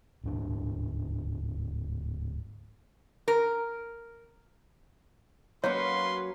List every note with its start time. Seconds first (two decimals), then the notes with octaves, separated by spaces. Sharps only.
0.24 D1 G#2 D4
3.28 A#4
5.64 F#3 A#3 C#4 F#4 B4 C#5 F5 C6